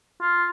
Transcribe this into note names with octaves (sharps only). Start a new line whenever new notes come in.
F4